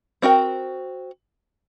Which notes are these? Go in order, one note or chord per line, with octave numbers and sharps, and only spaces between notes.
C4 F#4 A#4 G5